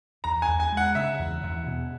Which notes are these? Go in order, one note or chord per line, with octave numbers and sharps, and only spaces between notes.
E2 A#5
G#5
E2
G#5
G#3
F#5
C#3 E5
E2
E2
B2